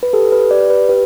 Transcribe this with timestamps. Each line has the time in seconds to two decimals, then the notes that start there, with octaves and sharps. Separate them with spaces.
0.03 B4
0.13 G4 A4
0.32 B4
0.51 G4 D5
0.70 B4
0.89 G4 B4